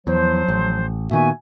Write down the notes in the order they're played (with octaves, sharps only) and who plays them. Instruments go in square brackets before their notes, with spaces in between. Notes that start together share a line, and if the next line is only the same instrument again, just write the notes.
[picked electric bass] E2 [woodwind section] F3 F#3 C5
[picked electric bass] A1
[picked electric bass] A#2 D#3 B3 [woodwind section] F#4 E5 G#5